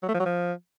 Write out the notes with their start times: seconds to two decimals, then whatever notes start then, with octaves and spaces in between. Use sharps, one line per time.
0.03 F#3
0.09 A3
0.14 F3
0.20 F#3
0.26 F3